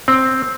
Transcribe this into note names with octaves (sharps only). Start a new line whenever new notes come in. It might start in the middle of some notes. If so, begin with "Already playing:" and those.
C4